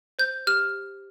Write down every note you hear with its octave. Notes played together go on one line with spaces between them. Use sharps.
C5 G6
G4 F6